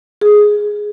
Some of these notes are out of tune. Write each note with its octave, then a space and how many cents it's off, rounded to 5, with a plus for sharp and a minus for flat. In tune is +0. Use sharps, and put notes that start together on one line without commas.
G#4 +5